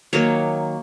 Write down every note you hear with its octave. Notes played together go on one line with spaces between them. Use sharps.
D#3 F#3 A#3 C#5